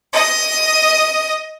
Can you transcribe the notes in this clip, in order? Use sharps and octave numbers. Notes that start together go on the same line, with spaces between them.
D#5